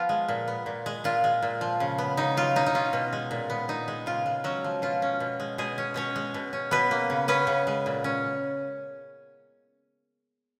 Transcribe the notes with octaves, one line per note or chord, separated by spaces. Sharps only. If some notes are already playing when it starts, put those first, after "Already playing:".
Already playing: F3 B3 F4
G#3
A#2
B3
A#2
G#3
A#2 F4
G#3
A#2
F3
C#3
B3
C#3 D#4
F#3 F4
B2 D#4
D#4
C#4 F4
B2
G#3
A#2
B3
A#2 D#4
G#3
C#3 F4
G#3
F#3 C#4 F#4
F3
B2 F4
C#4
B2
G#3
B2 G#3 G#4
C#4
B2 C#4 C#5
G#3
B2
C#4
B2 B3 B4
A#3
C#3
B3 C#4 B4
C#3
G#3
A#2
C#4